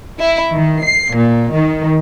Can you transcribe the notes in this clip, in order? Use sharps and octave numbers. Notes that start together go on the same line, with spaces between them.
E4
D#3
C7
A#2
D#3